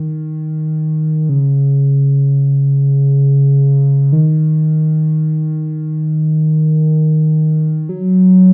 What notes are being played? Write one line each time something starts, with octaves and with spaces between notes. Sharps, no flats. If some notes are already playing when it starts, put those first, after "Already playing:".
Already playing: D#3
C#3
D#3
F#3